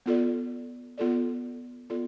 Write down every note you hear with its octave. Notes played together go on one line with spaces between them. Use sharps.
B3 F4 A4 D5
B3 F4 A4 D5
B3 F4 A4 D5